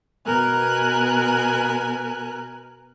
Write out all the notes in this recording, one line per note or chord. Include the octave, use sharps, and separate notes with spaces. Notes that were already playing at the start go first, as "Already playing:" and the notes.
B2 B3 A#4 G#5 F#6